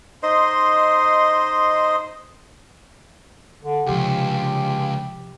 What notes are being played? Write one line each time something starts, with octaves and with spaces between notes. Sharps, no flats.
D#4 C5 D#5 C6
D3
C#2 C3 F3 G4